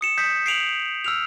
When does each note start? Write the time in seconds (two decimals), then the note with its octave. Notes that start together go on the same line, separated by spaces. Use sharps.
0.01 D#6 C#7 E7
0.17 D#6 G6 B6
0.46 C7 D7 F7 F#7
1.04 E6 F6 F7